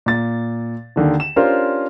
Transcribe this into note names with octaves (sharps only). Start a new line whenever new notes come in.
A#2 A6
D#2 D3 D#3
E7
C#4 D4 F4 G4 A#4 C5